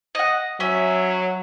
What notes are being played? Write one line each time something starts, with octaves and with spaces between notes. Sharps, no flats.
D#5 F#5
F#3 C#4 E5